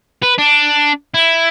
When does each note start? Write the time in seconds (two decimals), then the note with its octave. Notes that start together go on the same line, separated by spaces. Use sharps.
0.22 B4
0.38 D4
1.14 E4